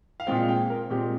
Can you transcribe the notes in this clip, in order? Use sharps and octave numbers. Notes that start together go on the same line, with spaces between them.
F5
A#2 G#3 C4 G5
G5
A#4
A#2 G#3 C4 G4